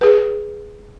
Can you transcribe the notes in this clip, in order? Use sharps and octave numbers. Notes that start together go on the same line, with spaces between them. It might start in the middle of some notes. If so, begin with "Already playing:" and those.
G#4 B4